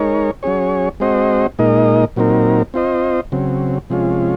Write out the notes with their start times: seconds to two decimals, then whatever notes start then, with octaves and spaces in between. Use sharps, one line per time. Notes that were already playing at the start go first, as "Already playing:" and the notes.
Already playing: G#3 D#4 A#4 C#5
0.43 F#3 C#4 G#4 C#5
1.00 G#3 C4 F#4 C5 D#5
1.59 A#2 G#3 D#4 A#4 D#5
2.16 A#2 F#3 C4 D#4 A#4
2.74 C4 F4 C5 D#5
3.32 C#3 F#3 C4
3.90 C3 F3 G#3 C#4 F4